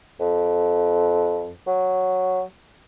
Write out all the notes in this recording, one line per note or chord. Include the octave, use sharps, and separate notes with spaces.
F2
F#3